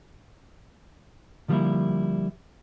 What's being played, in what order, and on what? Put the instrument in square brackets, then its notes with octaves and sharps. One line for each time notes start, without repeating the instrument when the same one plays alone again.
[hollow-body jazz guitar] D3 F3 G3 A3 A#3 E4